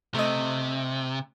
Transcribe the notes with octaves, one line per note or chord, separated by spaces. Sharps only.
C3 A3 D#5